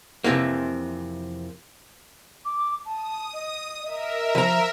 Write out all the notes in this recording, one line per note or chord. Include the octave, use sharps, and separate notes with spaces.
F2 A2 C3 E3 A#3
D6
A5 D#6
D#5
A#4 D#5 E5
F3 A#5